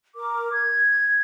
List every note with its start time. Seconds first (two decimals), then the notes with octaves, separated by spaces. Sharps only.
0.16 A#4 D6
0.53 G#6